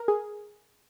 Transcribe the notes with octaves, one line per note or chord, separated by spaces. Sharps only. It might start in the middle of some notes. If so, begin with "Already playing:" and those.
Already playing: A#4
G#4